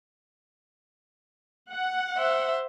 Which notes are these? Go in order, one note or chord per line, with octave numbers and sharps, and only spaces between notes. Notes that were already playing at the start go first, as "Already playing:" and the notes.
F#5
C5 E5